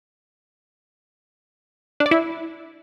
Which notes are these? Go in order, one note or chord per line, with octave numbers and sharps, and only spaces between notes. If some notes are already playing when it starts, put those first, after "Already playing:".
D4
D5
E4